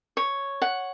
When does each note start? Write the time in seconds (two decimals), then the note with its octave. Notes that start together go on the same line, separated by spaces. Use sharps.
0.17 C#5
0.62 F#5